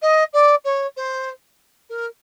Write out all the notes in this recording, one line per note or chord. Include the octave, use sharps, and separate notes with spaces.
D#5
D5
C#5
C5
A#4